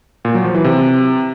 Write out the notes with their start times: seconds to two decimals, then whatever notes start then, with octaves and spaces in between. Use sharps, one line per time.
0.25 A#2
0.35 F#3
0.45 F3
0.54 E3
0.64 C3